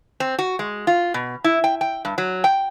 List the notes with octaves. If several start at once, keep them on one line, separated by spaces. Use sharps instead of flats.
C4
F#4
G#3
F4
B2
E4
G5
G5
G2
F#3
G5